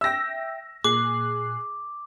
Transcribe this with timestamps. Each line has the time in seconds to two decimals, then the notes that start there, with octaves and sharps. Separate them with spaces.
0.01 E5 G5 E6 A#6
0.84 A#2 G#4 D6 F#6 C7